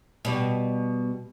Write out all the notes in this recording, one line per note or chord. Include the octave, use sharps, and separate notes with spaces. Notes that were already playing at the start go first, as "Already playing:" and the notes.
B2 G3